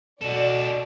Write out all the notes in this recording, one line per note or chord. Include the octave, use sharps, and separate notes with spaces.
B2 F#4 A4 D5